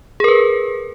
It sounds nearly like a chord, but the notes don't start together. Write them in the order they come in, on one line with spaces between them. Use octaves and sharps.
G#4 A#4 B4